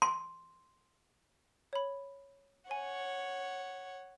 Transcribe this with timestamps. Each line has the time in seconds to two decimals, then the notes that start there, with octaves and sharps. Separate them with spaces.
0.02 C6
1.73 C#5 B5
2.71 C#5 F#5 G#5